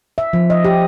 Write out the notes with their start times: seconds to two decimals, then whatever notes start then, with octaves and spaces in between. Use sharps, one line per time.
0.18 E5
0.33 F3
0.50 D#5
0.64 G4